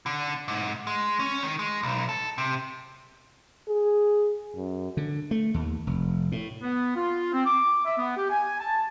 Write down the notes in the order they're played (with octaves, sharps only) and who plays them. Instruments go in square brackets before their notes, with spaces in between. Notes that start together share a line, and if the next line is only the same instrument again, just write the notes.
[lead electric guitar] D3
G#2
G#3
C#4
D#3
G#3
B1
A4
C3
[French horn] G#4
F#2
[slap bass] D3
A3
D#2
F1
A2
[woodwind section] B3
F4
C4
D6
E5
B3
G4
G#5
A5